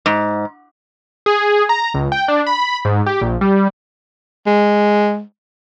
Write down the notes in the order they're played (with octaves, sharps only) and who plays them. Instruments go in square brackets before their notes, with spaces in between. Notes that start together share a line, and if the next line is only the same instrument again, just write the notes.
[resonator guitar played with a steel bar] G#2
[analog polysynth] G#4
A#5
C#2
G5
D4
B5
G#2
G4
A#1
G3
[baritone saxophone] G#3